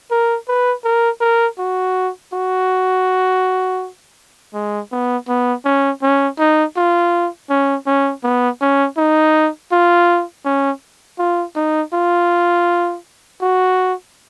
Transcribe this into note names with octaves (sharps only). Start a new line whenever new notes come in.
A#4
B4
A#4
A#4
F#4
F#4
G#3
B3
B3
C#4
C#4
D#4
F4
C#4
C#4
B3
C#4
D#4
F4
C#4
F4
D#4
F4
F#4